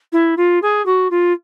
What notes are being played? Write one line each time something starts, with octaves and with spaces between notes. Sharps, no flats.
E4
F4
G#4
F#4
F4